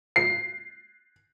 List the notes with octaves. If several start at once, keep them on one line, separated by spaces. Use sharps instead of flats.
C7